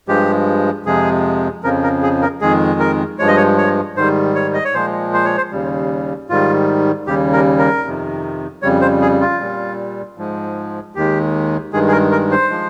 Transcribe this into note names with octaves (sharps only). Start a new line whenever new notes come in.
G2 F3 G#3 G4
F2 C3 F3 G#3 G#4
F2 C#3 F3 A#4
A#4
G#4
A#4
F2 D#3 G#3 G#4
A#4
G2 F3 G#3 C#5
D#5
C#5
C#5
G#2 D#3 G3 C5
C#5
D#5
C#5
A#2 F3 G#3 C5
C5
C#5
C5
D#2 C#3 G3
G#2 D#3 G3 F4
D#2 C#3 G3 G4
A#4
A#4
F2 C3 D#3
F2 C#3 G3 C#5
C5
G#4
F4
A#2 G3
G#2 F3 G#3
D#2 D#3 G#3 G4
G2 D#3 G#3 G#4
G#4
A#4
A#4
C5
F3 G#3